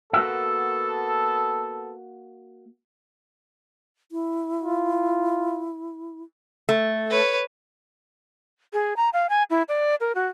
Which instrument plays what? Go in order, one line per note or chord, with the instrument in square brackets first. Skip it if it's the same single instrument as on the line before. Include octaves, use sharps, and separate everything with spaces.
[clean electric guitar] A#3 F#4 E5 [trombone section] B3 A4
[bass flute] E4
[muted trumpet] F4
[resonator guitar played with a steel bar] A3
[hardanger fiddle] B4 C#5
[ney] G#4
A#5
F5
G#5
E4
D5
A#4
F#4